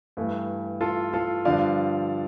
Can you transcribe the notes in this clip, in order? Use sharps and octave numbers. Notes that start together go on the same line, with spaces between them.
G2 E3 A3 E4
F4 A4
F4 A4
G2 D3 F3 D5 F5